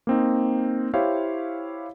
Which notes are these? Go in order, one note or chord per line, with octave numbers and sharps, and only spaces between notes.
A#3 C4 D#4
E4 G4 C5 C#5 E5 F5